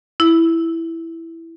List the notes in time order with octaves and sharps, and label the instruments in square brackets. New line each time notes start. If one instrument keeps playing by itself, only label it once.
[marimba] E4